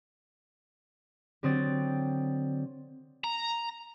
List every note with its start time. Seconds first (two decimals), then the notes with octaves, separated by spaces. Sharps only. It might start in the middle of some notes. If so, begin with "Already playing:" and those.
1.43 D3 F#3 C4 G5 D#6 A6
3.24 A#5